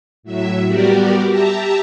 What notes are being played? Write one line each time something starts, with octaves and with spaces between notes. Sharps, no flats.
A2 F#3 E5
G3 B3 F#4 G4 A#4 D5
G4 E5 A5 A#5